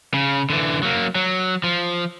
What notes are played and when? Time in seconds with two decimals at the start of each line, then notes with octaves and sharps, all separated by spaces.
0.14 C#3
0.50 D3 E3
0.83 F#3 A#3
1.15 F#3
1.64 F3